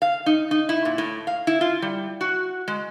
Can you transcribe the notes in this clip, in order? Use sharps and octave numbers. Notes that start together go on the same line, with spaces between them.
F5
D#4
D#4
E4
A#2
A2
F5
E4
F4
G3
F#4
G#3